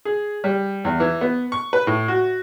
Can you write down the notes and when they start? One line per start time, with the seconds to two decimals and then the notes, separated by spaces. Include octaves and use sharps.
0.05 G#4
0.44 G3
0.85 E2
1.00 E3
1.21 B3
1.52 C#6
1.73 B4
1.87 A2
2.08 F#4